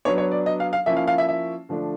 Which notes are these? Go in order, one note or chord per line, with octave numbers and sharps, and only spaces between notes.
F#3 B3 D4 C#5
C#5
D5
D#5
F5
F5
F3 A#3 C#4 E4 E5
F5
F5
E5
E5
D3 F3 A3 D4